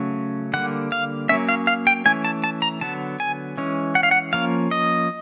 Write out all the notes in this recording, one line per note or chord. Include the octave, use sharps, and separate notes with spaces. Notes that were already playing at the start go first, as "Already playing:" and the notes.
Already playing: C#3 F#3 A3 C#4
D3 G3 A#3 F#5
F5
F#3 A#3 C#4 E5
F5
F5
G5
E3 A3 C#4 G#5
A5
A5
A#5
D3 F#3 B3 A5
G#5
E3 G#3 C#4
F#5
F5
F#5
F3 A#3 C#4 F5
D#5